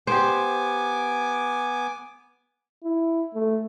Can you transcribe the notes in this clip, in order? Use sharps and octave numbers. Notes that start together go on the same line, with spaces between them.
B3 G4 C5 G#5 D6
E4
A3